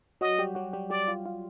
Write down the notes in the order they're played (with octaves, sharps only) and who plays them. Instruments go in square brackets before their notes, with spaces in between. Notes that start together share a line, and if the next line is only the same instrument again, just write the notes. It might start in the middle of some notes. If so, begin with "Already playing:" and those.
[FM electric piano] F#3 F#4 [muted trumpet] D#5
[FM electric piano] G3 G4
F#3 F#4
G3 G4
[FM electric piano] G3 G4 [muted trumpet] D5
[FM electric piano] F4
F4